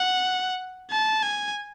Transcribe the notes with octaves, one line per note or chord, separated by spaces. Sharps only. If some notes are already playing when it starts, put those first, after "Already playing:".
Already playing: F#5
A5
G#5